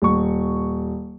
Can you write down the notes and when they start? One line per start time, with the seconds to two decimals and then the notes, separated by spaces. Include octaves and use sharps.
0.02 D#1 C#6